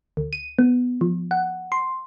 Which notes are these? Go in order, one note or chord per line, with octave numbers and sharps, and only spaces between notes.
D2
D#7
B3
F3
F#5
C6